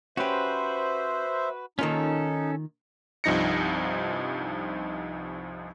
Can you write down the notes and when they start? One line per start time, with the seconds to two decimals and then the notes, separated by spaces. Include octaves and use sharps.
0.17 C#4 F#4 G4 B4 C5 E5
1.79 D#3 A#3 C#4 D#4 F4 A4
3.24 C2 G2 F3 D#4 A#6 C#7